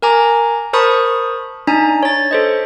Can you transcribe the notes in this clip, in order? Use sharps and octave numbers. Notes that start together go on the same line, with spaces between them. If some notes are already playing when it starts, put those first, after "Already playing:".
A#4 G#5 A#5 D6
A#4 C5 A5 B5 C#6 D#6
D4 D#4 G#5 A#5
C#5 A6
A4 C5 D#5